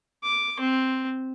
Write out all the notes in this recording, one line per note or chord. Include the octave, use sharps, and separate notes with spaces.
D6
C4